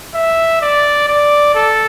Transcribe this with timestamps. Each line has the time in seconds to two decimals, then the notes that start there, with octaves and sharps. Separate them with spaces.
0.14 E5
0.61 D5
1.08 D5
1.55 A4